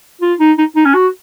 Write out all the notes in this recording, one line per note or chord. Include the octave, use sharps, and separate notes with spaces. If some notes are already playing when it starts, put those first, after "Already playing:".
F4
D#4
D#4
D#4
C#4
F#4